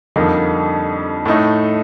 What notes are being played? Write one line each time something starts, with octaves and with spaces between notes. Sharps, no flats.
F2 D3 G3 A#3 D#4
A2 A3 D#4